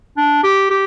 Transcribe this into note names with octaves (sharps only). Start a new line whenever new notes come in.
D4
G4
G4